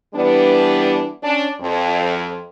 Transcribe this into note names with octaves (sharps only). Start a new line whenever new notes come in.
E3 G3 B3 D4
C#4 D4
F2